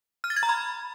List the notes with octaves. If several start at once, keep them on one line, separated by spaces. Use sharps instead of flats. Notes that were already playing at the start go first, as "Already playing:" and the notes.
F6
A6
G#6
A#5
B5